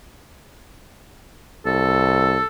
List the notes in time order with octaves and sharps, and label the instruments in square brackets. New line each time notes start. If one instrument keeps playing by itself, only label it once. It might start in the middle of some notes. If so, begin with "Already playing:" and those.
[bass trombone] C2 [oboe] A4